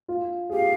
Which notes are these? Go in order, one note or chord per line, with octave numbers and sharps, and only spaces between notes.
F4
G#4
G4 F5